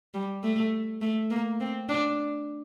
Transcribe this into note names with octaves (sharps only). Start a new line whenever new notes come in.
G3
A3
A3
A#3
C4
D4